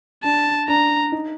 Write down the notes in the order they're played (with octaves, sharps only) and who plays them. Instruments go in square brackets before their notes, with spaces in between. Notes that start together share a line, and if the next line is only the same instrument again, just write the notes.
[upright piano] D4 [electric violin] A5
[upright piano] D4 [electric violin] A#5
[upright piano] D#4